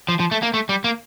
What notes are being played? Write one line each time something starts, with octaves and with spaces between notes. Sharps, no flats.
F3
F3
A3
A#3
A3
G3
A#3